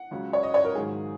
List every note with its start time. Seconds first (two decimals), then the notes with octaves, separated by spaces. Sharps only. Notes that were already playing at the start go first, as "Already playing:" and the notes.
Already playing: F#5
0.11 C#2 C#3 F#3
0.33 C#5
0.43 D#5
0.54 C#5
0.65 A#4
0.75 G#2 D#3 F#3 G#4